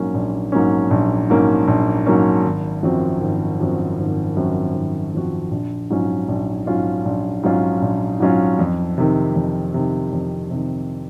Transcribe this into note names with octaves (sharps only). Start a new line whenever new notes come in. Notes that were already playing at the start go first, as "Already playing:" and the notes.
Already playing: A#1 G#2 F#3 A#3 C#4
A#1
G#2 F#3 A#3 C#4
A#1
G#2 F#3 A#3 C#4
A#1
G#2 F#3 A#3 C#4
G#1
F#2 F3 C4 F#4
G#1
F#2 F3 C4 F#4
G#1
F#2 F3 C4 F#4
G#1
F#2 F3 C4 F#4
A#1
G#2 F#3 C#4 F4
A#1
G#2 F#3 C#4 F4
A#1
G#2 F#3 C#4 F4
A#1
G#2 F#3 C#4 F4
F2
C3 D#3
F2
C3 D#3
F2
C3 D#3